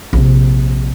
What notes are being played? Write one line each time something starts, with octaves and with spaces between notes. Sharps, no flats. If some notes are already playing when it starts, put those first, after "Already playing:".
A#1 C3